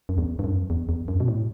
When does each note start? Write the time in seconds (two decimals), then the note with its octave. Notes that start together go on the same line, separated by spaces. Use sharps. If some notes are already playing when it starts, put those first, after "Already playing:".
0.09 F#2
0.18 E2
0.39 G2
0.44 F#2
0.70 E2
0.89 E2
1.08 F#2
1.20 B2
1.28 A2